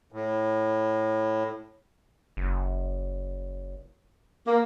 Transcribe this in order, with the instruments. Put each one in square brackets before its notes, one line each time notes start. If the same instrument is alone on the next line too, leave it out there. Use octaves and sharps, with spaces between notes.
[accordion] A2
[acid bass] F#1
[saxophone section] A#3